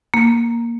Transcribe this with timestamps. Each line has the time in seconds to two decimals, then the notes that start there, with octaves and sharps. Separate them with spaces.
0.14 A#3